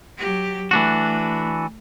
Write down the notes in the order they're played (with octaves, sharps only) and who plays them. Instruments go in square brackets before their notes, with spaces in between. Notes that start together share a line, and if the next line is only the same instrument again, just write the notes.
[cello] F#3 G4
[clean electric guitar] E3 D4 F#4 [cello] A3